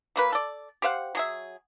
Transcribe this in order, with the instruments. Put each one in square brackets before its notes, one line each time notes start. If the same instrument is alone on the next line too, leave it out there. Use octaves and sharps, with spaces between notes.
[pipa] F#3 A#3 B4
A4 D5
G4 C5 F5 F#5
F#3 G#4 E5